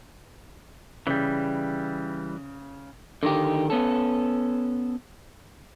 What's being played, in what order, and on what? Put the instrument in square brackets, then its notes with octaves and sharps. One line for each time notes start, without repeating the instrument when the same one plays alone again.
[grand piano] C#3 [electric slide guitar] E3 G3
[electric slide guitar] D3 D#3 G4
B3 C#4 A4